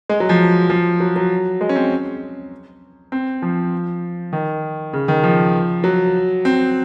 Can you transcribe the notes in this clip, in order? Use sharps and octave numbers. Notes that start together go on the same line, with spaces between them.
G#3
F#3
F3
F3
F#3
F#3
G#3
C#4
C4
C4
F3
D#3
C#3
D#3
F3
F#3
C4